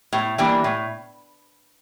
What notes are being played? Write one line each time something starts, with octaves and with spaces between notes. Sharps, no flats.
A2
E3 G3 A#3 D4
A2